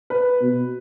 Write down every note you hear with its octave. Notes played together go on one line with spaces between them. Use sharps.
B4
B2